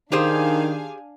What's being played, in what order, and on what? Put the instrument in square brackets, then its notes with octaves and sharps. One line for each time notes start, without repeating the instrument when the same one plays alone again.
[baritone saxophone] D#3 [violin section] D4 F5 G#5 [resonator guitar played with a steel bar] G4 G#4 C5